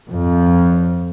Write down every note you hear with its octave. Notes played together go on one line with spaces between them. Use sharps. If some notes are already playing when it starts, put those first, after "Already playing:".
F2 F3